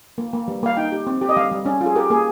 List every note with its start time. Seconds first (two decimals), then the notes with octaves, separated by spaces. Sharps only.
0.18 A#3
0.33 A#3
0.48 G3
0.63 A#3 F5
0.77 D#4 G5
0.92 G4
1.07 C4
1.21 G4
1.29 D#5
1.36 G3 F5
1.51 G3
1.66 C#4
1.81 F4
1.86 G#4
1.96 G4 A#4
2.10 A#3 G#4